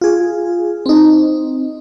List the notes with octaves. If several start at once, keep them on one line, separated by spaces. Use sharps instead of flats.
F4 G#4
C4 D#4